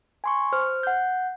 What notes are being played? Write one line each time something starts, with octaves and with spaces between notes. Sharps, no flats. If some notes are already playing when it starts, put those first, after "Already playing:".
G#5 C6 C#6
C5 F6
F#5 G6